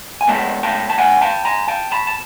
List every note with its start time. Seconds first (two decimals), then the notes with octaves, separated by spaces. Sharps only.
0.21 G#5
0.28 B2 G#3 B3 G5 A5
0.63 G5 A5
0.90 A5
0.98 F#5 G#5
1.21 G5 A5
1.45 G#5 A#5
1.68 G5 A5
1.92 A5 B5
2.07 A5